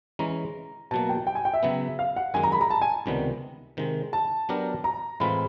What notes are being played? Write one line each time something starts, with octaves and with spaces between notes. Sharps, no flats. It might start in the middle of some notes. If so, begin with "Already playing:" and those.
E3 G#3 C#4 A#5
B2 F#3 A#3 A5
G5
G5
G#5
G5
E5
C#3 F#3 B3
F5
F#5
F#2 D#3 G#3 G#5
A#5
B5
A#5
A5
G#5
C#2 C3 D#3 G3 B3
C3 D#3 G#3
A5
F#3 B3 D4 G4 A#4
A#5
A2 E3 G#3 C4 F4 B5